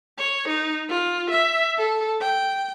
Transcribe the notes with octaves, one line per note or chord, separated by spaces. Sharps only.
C#5
D#4
F4
E5
A4
G5